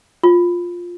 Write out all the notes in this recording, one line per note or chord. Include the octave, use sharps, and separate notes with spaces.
F4